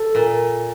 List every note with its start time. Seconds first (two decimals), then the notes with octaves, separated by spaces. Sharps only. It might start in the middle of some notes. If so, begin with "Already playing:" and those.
Already playing: A4
0.15 A#2